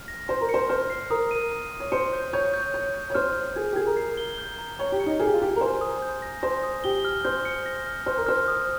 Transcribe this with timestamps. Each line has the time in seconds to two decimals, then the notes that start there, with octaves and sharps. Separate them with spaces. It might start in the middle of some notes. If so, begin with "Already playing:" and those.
Already playing: F6
0.08 A#6
0.28 C5 C6
0.41 A#4
0.49 C5 C#7
0.69 C5 F6
0.90 C7
1.10 A#4 D#6
1.31 D#7
1.51 D#6
1.72 D#6
1.80 C#5
1.92 C5 C#7
2.13 G6
2.33 C#5 G6
2.54 G6
2.74 C#5 G6
2.95 G6
3.10 C#5
3.15 C5 F6
3.36 F6
3.56 G#4 G#6
3.72 G4
3.76 G#4 G#6
3.87 A#4
3.97 C7
4.17 G7
4.38 G6
4.58 A#5
4.79 C#5 G#6
4.92 G4
5.00 C#7
5.06 D#4
5.19 G#4 F6
5.27 G4
5.34 F4
5.41 G4 G#6
5.56 A#4
5.61 C5 G#5
5.81 D#6
6.02 G6
6.22 A#6
6.43 C5 A#6
6.63 D#6
6.84 G4 G7
7.05 F6
7.25 C5 G6
7.45 C#7
7.66 A#6
7.87 F6
8.06 C5 F6
8.17 A#4
8.27 C5 F6
8.48 D#6